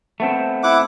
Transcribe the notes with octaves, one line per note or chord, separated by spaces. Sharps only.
A3 B3 C4
E4 F#5 D6